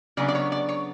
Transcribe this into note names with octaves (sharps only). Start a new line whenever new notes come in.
C#3 F#3 B3 D4 D5
D5
C#5
D5
C#5